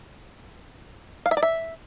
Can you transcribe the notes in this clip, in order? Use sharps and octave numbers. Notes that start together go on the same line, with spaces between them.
F5
E5
D5
E5